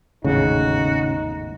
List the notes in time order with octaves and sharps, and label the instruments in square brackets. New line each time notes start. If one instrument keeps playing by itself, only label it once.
[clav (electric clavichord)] G#1 E2 A2 [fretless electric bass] C#3 [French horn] D#4 [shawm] F#4